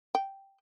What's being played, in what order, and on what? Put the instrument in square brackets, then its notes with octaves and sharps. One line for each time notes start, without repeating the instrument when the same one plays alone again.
[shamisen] G5